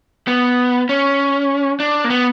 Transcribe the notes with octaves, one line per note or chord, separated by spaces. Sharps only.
B3
C#4
D4
A#3
B3